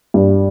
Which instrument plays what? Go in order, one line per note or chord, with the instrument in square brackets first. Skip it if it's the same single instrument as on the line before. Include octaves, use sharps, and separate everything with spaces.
[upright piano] G2